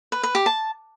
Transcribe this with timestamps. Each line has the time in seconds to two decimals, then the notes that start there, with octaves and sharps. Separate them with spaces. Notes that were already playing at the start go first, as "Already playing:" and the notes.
0.12 B4
0.23 B4
0.35 G4
0.46 A5